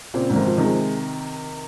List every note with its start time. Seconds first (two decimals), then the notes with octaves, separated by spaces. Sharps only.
0.14 A#2 C#3 C4
0.30 G#2
0.35 C3 D#3
0.47 F3
0.58 C3 D#3
0.64 G#3